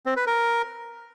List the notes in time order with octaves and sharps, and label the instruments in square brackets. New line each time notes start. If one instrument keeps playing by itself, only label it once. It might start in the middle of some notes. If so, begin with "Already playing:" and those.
[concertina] C4
B4
A#4